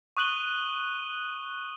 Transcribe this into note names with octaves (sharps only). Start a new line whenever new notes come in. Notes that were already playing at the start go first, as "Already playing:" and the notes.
C#6 D#6 F#6 D#7 F#7 G7